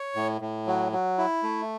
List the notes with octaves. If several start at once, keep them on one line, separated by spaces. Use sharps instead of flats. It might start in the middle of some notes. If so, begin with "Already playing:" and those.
Already playing: C#5
A2
A2
F#3
F#3
E4
A3